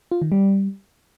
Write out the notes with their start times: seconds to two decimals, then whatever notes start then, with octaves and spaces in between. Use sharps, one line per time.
0.11 F4
0.22 D#3
0.32 G3